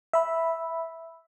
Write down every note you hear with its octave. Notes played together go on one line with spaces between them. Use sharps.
E5 B5